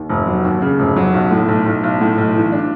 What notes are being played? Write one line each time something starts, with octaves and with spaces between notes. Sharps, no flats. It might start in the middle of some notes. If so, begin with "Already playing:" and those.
Already playing: D#2
F1
F#3
D#2
C#3
F1
F#3
B1
A2
B1
B1
B1
A2
B1
E3
D4